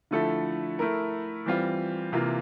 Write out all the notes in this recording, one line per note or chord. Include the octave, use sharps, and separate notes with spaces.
D3 F3 A3 E4 A4
A3 E4 A#4
E3 G3 C4 F4
C3 E3 A#3 F4